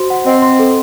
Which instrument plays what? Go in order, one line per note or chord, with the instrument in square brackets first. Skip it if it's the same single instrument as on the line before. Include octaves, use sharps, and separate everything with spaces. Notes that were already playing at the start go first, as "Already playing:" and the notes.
Already playing: [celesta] F#4 C5 C6
F#5
[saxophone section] C4 [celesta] D#5
[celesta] C6
A4